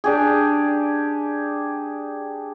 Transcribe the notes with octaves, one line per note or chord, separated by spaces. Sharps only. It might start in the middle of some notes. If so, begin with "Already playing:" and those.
D4 G4 G#4